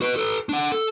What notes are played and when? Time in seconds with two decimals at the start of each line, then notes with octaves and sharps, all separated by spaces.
0.01 F#4 B4
0.16 A4 B4
0.49 D4 F#5
0.72 A4